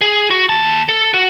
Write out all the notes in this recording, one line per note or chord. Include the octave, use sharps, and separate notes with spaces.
G#4
F#4
D#2 A5
A4
F#4